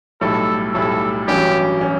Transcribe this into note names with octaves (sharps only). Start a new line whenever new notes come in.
B1 A2 G3 A4
B1 A2 G3 A4
A1 G2 F#3 C#4 G4
F#3 C#4